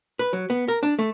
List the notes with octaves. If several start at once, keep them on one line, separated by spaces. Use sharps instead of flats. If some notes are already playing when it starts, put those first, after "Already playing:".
B4
F#3
B3
A#4
D4
A3